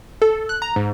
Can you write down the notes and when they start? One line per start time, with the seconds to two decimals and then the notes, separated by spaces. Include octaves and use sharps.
0.22 A4
0.49 F#6
0.62 A#5
0.76 G#2